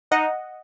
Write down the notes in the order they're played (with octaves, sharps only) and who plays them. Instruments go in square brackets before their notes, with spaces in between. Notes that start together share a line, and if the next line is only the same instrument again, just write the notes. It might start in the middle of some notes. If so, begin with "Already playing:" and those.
[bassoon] D#4 [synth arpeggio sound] D#5 F#5